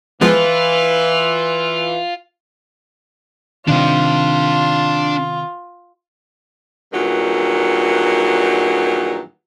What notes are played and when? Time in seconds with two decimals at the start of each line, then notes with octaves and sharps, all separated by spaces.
0.21 E3 F3 G#3 B3 F4 B4
3.67 C3 D#3 D4 F4 G5
6.93 E2 G2 A#2 D#3 F#3